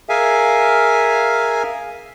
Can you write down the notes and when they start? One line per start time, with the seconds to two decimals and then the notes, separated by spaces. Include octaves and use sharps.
0.09 G#4 A#4 E5 F5 G#5